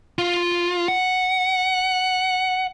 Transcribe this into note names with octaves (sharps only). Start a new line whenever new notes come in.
F4
F#5